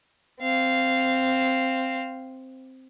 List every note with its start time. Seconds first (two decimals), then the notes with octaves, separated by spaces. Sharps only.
0.41 C4 F5